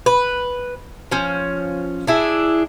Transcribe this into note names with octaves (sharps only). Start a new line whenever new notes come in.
B4
F3 C#4
D4 E4 G#4